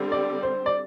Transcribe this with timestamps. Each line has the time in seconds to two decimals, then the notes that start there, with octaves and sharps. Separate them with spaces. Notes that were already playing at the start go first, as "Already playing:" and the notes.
Already playing: D3 G3 C4
0.12 D5
0.43 C5
0.66 D5